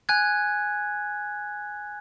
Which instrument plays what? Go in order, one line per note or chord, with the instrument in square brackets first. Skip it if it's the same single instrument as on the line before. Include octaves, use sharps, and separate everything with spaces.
[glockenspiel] G#5 F#6 G#6